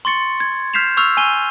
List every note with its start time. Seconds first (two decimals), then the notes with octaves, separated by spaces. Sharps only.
0.05 C6 C#6 A6 C#7
0.40 G#6
0.74 F6 G6 B6 C7 E7 F7
0.97 C#6 E6 F6 F7
1.17 G#5 D#7 G7